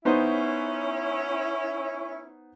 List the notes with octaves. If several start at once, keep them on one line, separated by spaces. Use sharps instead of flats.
B3 C#4 D#4 E4 C5